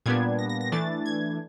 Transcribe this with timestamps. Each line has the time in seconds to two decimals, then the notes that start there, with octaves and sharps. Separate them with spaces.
0.06 A#2 G3 B3 D4 G#6
0.39 A#6
0.49 A#6
0.61 A#6
0.72 E3 A3 D4 A6
1.06 G#6